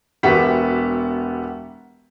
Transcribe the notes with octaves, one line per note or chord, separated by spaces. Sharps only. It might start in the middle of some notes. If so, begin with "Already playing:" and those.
E1 B3 F#4 G4 E5 B6